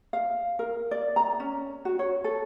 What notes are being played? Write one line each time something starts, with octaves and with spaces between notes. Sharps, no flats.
F5
A#4
D5
A#5
C#4
F#4
C#5
A4